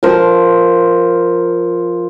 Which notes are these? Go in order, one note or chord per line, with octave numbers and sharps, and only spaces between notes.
F3 A#4 C5